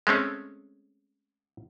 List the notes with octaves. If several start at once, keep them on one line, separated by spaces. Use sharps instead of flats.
G#3 A3 C4 C#4